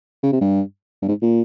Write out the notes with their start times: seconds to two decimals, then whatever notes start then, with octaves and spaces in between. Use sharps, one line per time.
0.23 C#3
0.32 C3
0.41 G2
1.02 G2
1.08 G#2
1.22 A#2